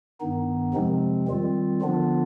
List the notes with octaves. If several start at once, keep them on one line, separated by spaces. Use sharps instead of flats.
G2 D#3 B3 D#4
F2 C3 F3 G#3 C4
D#3 G3 C4 F4
D3 F3 B3 D4 F4